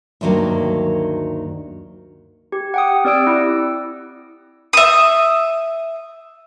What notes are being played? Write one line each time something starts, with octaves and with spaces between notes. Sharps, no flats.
D2 G2 D#3 F#3 A#3
G4
F#5 G5 D#6
C4 G4 D5 E6 D7
E4
E5 D#6